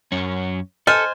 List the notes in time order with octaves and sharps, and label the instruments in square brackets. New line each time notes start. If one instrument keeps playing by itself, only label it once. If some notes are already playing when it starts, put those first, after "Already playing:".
[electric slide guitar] F#2 C#4
[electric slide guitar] A4 [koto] C5 G#5 [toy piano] D#5 [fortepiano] F6